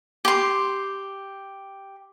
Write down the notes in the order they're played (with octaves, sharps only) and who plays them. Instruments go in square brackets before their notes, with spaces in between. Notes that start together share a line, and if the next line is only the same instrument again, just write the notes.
[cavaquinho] G4 C6